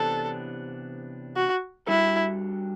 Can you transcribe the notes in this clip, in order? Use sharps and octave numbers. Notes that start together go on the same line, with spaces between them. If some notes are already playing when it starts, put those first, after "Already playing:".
Already playing: C3 E3 B3 D4 G4 A4
F#4
G3 D4 E4 F#4 A4